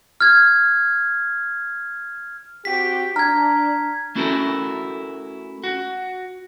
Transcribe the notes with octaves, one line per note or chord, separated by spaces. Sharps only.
F6 G#6
C4 F#4 G4 B6
D4 A#5 F6 G#6
A3 C#4 E4 F#4 A4 A#4
F#4